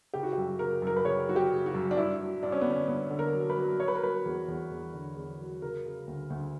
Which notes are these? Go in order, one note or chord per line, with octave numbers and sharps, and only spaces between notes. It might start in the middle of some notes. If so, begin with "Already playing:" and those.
C#3 G4
F#4
F#2 G4
C#3 A#4
F#2 A#4
B4
C#3 C#5
F#3 F#4
G4
C#3
F#4
F#2
D4
G2 E4
F#3
G2 D4
C#4
D3 B3
C#4
G2 B3
D3
A#4
F#3
B4
F#3
F#3 C#5
B4
A#4
F#3 B4
E2
E2
E2
D3
E2
F#3
C#3 A#4
C#3
D2
D2